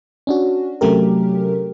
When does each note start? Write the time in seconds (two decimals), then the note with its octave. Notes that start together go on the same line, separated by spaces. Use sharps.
0.27 C#4 D4 F#4
0.81 C3 F#3 A3 C#4 G4 A#4